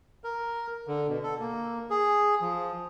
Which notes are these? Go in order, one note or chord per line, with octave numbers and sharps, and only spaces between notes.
A#4
D3
B2
A4
A#3
G#4
F3